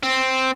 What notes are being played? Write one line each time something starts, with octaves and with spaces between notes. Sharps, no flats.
C4